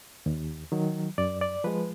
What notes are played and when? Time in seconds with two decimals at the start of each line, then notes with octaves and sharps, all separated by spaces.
0.26 D#2
0.72 D#3 F#3
1.18 F#2 D5
1.41 D5
1.64 F3 G#3 B4